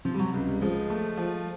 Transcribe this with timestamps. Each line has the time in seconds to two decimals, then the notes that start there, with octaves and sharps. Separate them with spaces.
0.05 C3 F3
0.14 G3
0.19 F#3
0.34 C#2
0.47 G3
0.61 F3 G#3
0.90 A3
1.17 F3